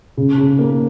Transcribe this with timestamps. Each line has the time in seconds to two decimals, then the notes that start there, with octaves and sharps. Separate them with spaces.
0.17 C#3
0.38 C#3
0.59 A#3